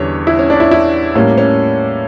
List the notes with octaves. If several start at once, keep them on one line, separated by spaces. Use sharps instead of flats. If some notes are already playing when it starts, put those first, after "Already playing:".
Already playing: E2 D3 G3 C#4 C#5
E4
C#4
D4
E4
E4
A2 G3 A#3 C#4
C#4